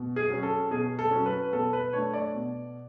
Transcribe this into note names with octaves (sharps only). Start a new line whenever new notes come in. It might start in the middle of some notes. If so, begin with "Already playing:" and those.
Already playing: B2
G#4
F#3 C#4
A4
B2 G#4
A4
F#3 C#4
B4
B2 A4
B4
A3 D4 C#5
D5
B2